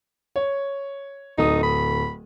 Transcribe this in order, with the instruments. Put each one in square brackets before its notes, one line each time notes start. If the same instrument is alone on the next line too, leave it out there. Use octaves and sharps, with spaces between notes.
[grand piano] C#5
[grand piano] D1 A4 D#6 [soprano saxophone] D#4
[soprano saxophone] B5